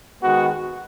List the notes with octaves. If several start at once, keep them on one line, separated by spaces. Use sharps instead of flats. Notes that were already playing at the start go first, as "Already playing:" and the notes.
D#3 G#3 B3 F#4